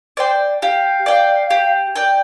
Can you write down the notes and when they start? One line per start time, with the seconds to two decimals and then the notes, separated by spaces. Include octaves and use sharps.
0.17 C5 D5 G5
0.62 G4 F5
1.06 D5 G5
1.50 G4
1.96 D5 G5